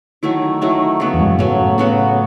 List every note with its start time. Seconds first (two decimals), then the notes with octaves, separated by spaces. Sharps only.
0.23 D#3 F#3 A3 E4
0.61 D#3 F#3 A3 E4
1.00 C#3 F#3 B3
1.14 E2
1.20 G#2
1.26 F#2
1.38 A2 C#3 F#3 B3
1.78 C#3 F#3 B3 F#4